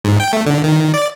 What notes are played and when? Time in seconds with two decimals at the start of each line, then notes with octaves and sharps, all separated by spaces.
0.04 G#2
0.20 G5
0.33 A3
0.46 D3
0.64 D#3
0.94 D5